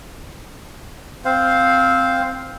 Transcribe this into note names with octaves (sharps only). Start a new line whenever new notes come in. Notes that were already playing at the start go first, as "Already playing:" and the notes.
C4 C5 F5